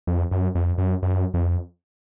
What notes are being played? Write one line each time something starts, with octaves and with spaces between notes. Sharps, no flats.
F2
F#2
F2
F#2
F#2
F2